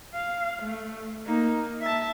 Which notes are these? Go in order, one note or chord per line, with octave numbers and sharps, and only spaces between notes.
F5
A3
A#3 D#4
E5 A5